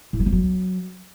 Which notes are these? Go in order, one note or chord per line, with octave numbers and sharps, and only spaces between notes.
A2
F#3
F3
F#3